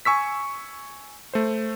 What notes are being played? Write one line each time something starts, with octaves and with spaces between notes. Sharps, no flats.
G#5 C#6 E6 B6
A3 C5